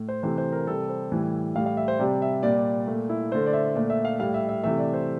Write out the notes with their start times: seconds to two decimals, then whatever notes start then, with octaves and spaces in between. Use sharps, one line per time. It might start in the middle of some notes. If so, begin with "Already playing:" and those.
Already playing: A2
0.09 C5
0.23 C3 E3 A3 C5
0.38 C5
0.53 A#4
0.67 C3 G3 A4
0.89 C5
1.12 A2 E3 G3
1.56 A2 G3 F5
1.66 F5
1.77 E5
1.88 C5
1.99 C3 G3 D5
2.22 E5
2.43 A#2 G3 D5
2.58 D5
2.87 A#2 A3
3.09 E4
3.31 D3 A3 C5
3.47 D5
3.53 E5
3.75 A#2 A3 D5
3.90 E5
4.05 F5
4.20 A2 G3 F5
4.34 E5
4.49 E5
4.63 C3 E3 A3 E5
4.78 D5
4.93 C5